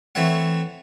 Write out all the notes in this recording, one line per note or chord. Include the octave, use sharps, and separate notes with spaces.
E3 A3 C4 C#5 F#5